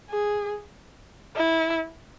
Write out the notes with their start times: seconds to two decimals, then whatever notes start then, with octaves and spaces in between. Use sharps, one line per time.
0.10 G#4
1.36 E4